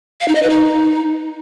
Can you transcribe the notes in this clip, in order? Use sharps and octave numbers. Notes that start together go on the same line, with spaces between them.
F5
D#4
D#5
B4
D#4